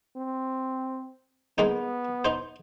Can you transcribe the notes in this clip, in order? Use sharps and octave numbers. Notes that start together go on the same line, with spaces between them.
C4
G#3 A#3 B3 D#4
D#4 C5